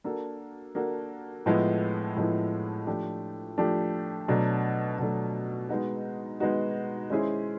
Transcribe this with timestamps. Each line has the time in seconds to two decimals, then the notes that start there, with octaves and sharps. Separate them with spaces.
0.04 A#3 D4 F#4 A4
0.75 A#3 D4 F#4 A4
1.46 A2 F3 G#3 B3 E4
2.16 A2 F3 G#3 B3 E4
2.87 F3 A3 D4 G4
3.58 F3 A3 D4 G4
4.28 B2 F#3 A3 D4
4.99 B2 F#3 A3 D4
5.69 G#3 B3 D#4 F#4
6.40 G#3 B3 D#4 F#4
7.10 G#3 C#4 E4 G#4 C5